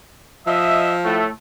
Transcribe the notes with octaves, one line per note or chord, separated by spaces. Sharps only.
F3 D#5 E5
A2 A3